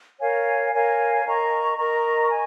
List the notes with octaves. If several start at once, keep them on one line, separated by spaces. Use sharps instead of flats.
A#4 C#5 F5 G#5
A#4 C#5 F5 G#5
A#4 D#5 A#5 C#6
A#4 D#5 A#5 C#6
G#5